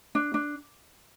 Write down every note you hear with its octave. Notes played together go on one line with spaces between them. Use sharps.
D4
D4